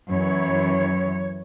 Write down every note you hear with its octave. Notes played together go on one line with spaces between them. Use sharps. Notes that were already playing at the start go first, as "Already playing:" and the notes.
F#2 E3 C#5